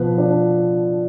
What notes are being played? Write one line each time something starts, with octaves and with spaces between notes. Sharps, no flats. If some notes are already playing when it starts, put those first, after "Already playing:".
Already playing: B2 F3 B4
D4